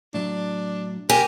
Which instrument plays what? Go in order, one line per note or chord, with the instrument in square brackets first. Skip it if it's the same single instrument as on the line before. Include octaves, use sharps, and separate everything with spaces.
[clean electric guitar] A2 F#3 [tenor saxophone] D4
[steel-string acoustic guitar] G4 [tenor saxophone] A#4 [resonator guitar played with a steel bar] G#5